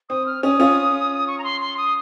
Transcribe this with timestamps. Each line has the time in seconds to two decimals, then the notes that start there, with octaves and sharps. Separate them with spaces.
0.09 C4 D#6
0.26 F6
0.43 C#4 D#6
0.60 C#4 F4
1.27 C#6
1.38 A#5
1.44 C6
1.61 C6
1.77 D#6